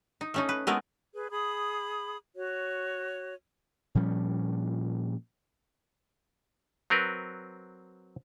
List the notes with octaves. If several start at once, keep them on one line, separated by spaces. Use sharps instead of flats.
D#4
A3 C#4 D#4
B4
G#3 A3 B3 E4 A#4
G#4 B4
G#4 B5 D#6
F#4 C#5
A#2 F3 G3 C#4
F#3 C4 A#4 B4